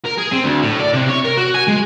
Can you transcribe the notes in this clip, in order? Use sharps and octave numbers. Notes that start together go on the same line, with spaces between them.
A#4
G#4
C4
D2
A2
D5
C3
C#5
A#4
F#4
G#5
G#3